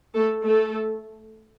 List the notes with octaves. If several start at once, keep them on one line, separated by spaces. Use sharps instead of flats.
A3 A4
A3 A4